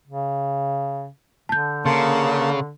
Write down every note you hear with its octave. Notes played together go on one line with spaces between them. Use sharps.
C#3
D3 A5 G6
C#3 A#3 A5 C6